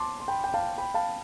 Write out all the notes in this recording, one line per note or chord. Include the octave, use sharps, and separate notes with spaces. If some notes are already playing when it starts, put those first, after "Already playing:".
Already playing: A5 C6 D6
C6
G5 B5
G5
F5 A5
G5 B5
F5 A5